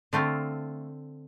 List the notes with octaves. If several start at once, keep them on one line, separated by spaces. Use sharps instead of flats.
D3 A3 C4 F4